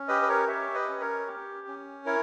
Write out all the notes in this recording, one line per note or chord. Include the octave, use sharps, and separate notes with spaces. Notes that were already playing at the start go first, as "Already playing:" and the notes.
Already playing: C#4
G4 B4 D#5
B4
A#4 C#5
G4 C#5 E5
B4 D#5
C#4
A#4 C#5
G4
C#4
E4 A#4 C#5